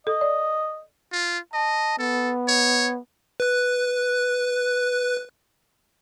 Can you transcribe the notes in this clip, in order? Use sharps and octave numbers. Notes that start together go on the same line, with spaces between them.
A4 D#5
D5
F4
D#5 A5
B3 A4
C#5
B4 F#6